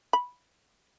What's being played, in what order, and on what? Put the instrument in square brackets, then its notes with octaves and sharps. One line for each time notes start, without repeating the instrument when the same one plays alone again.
[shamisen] B5